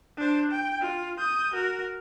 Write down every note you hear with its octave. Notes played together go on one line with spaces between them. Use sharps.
D4 C5
G5
F4
D#6 G6
F#4 A#4